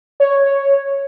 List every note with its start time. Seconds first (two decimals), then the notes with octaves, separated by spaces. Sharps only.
0.20 C#5